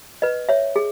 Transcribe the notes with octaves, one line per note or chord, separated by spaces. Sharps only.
B4 D#5
C#5 E5
G#4